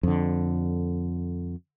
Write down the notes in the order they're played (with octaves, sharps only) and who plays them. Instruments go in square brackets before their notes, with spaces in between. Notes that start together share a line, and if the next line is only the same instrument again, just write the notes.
[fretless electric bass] F2 D3